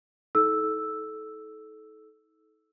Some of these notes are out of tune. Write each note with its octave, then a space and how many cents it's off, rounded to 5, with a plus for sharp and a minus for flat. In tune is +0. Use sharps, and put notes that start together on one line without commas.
D#4 +40 A4 -20 E6 +0